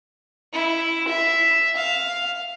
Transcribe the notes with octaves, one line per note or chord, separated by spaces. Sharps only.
E4
E5
F5